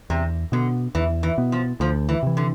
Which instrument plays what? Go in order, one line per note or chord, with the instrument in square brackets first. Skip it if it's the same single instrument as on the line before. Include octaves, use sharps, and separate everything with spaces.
[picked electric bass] E2 [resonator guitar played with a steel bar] C3
[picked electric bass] B2 B3 [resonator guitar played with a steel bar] D3
[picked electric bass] E2 [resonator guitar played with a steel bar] E3
[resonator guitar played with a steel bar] E3
[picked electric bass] B2 B3
[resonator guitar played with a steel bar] F3
[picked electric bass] D2 [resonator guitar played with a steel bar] F3
[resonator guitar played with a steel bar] E3
[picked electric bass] C3 E3
[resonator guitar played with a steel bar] D3